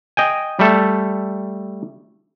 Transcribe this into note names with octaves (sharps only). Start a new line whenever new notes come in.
D#5 G5 G#5
G3 A3 A4